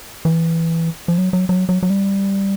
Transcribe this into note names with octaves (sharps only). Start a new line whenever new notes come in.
E3
F3
F#3
F#3
F#3
F#3
F#3
G3